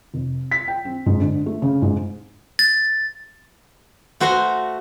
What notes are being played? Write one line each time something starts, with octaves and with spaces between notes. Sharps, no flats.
F1
B6
G5
C4
G#2
D3
A3
C#3
G#2
A6
A3 F#4 C5 F#5 A#5 C6